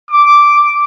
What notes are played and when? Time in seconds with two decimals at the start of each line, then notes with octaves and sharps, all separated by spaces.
0.11 D6